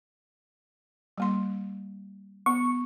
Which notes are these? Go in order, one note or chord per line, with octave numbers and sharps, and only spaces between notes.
G3 A#3 C6
B3 C#6